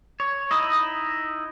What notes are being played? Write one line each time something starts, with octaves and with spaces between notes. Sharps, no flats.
C#5
D#4 E4 D#5